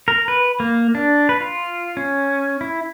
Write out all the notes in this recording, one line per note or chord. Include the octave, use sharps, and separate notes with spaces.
A#4
B4
A#3
D4
B4
F4
C#4
E4